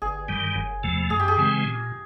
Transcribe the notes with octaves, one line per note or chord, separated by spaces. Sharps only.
G1 G#4
G2 D#3 G3
F#1
E2 C3 F3 A3
F#2 G#4
G4
G#4
C#3 E3 G#3 C4
A#2